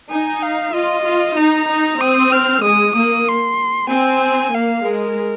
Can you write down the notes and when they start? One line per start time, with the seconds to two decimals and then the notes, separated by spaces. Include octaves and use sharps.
0.10 D#4 G#5
0.42 F5
0.74 F4 D#5
1.05 F4
1.37 D#4 A#5
1.69 D#4
2.00 C4 D#6
2.32 F6
2.64 G#3 D#6
2.95 A#3 D#6
3.28 C6
3.90 C4 G#5
4.53 A#3 F5
4.85 G#3 A#4